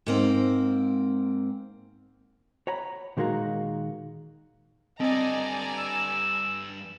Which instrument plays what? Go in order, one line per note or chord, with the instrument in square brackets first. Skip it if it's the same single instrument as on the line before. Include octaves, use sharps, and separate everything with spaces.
[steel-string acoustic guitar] G#2 A#3 C4
[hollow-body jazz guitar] C#5 F#5 A#5 B5
A#2 D#3 G#3 A#3 F#4 A#5
[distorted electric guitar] G2 A4 [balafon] C4 [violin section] D5 G#5 A#5 [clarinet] D#5
[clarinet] E6